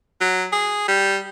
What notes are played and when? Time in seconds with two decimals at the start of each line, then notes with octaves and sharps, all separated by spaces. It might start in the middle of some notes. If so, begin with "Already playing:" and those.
0.21 F#3
0.52 G#4
0.88 G3